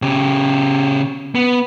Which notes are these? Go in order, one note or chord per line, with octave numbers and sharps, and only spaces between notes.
C#3 G4
B3